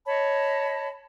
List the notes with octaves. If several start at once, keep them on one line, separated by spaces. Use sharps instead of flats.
C#5 D#5 A5 B5